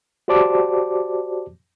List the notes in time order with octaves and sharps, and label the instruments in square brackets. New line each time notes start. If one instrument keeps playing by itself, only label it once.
[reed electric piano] F#4 G4 C5 D5 A5 D6